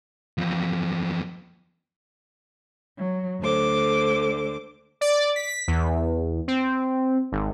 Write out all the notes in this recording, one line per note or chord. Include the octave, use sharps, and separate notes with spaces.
E2 F3
F#3
D2 D3 C5 D6
D5
B6
E2
C4
G#1